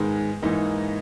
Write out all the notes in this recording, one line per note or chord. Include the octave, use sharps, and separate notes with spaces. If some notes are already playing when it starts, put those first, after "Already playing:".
Already playing: G#2 D#3 G#3 B3
G#2 E3 A#3 D#4